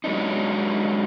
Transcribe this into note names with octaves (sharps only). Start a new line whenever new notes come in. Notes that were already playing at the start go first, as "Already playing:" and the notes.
F#3 G#3 C4 D4 D#4